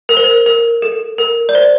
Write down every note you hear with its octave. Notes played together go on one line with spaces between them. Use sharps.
A#4
C5
A#4
A#4
A4
A#4
D5
C5